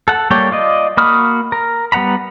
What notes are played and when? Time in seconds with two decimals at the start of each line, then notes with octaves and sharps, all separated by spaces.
0.08 A4 F#5
0.30 G3 A#3 A4 C#5 G5
0.51 F4 D5 D#5
0.97 A#3 F#4 B5 D#6 F6
1.52 A#4
1.92 G3 B3 F#5 A#5 B5